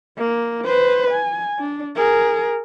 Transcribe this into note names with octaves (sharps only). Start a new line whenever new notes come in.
A#3
B4 C5
G#5
D4
G#4 A#4